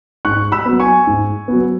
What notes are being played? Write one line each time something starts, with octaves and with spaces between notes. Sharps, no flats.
G#2 C#6 F#6
B5 E6
F#3 B3
G#5 C#6
G#2
F#3 B3